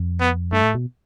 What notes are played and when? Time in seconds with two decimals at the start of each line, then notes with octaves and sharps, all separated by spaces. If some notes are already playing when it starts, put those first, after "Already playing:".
Already playing: F2
0.20 B3
0.52 G2 A3
0.63 A2
0.75 B2